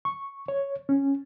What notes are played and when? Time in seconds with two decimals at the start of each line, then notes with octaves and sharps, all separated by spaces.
0.05 C#6
0.48 C#5
0.89 C#4